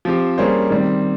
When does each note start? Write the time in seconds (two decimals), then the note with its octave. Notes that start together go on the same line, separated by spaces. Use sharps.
0.05 F3 C4 G4
0.38 G3 A#3 C#4 G#4 C5
0.70 D#3 G3 C4